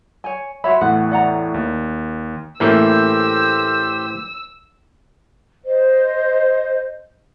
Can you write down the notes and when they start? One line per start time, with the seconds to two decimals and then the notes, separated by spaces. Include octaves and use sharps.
0.24 C#5 G#5
0.64 F#4 C#5 E5 B5 C6
0.81 E2 A2 F#5 F#6
1.11 D5 F#5 A#5
1.54 D#2
2.60 A2 E3 A3 A#3 C#4 G4 C5 E6
5.64 C5 D#5